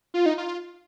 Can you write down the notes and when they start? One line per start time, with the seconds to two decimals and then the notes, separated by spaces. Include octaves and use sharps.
0.14 F4
0.26 D#4
0.38 F4